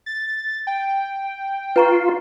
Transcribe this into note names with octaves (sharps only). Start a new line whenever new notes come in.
A6
G5
F4 B4 A#5 C#6